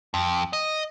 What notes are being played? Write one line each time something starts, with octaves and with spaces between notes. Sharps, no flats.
F2
D#5